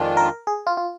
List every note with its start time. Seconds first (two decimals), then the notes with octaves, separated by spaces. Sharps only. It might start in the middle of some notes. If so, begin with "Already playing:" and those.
Already playing: F2 D#3 G#3 D4 F4
0.17 A#4
0.47 G#4
0.67 F4
0.77 F4